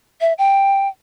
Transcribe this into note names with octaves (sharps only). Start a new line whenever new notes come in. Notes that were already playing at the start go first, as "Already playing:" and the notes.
E5
G5